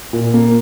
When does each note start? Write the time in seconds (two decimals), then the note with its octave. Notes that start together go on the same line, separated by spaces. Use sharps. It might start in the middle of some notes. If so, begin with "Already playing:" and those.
0.13 A#2
0.34 A#3